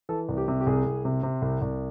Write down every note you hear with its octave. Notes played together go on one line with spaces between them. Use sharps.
E3 A4
C2
G4
C3
G4
C2 G#4
C2
C3
C3
C2
C2